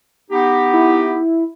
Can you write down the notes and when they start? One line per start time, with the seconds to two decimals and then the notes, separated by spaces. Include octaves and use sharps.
0.31 B3 D#4 G4
0.74 E4